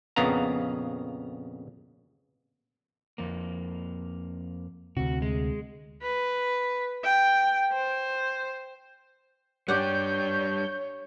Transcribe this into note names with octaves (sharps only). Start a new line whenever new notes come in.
A#1 F2 C#3 B3 F5 A#5
F2 A#3
D2 C3 F#4
G#3
B4
G5
C5
G3 D4 G4 C#5 D5 F#5 G6